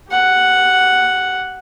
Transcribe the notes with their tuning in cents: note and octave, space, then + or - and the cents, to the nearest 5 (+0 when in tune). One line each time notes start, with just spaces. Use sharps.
G4 -25 F#5 +0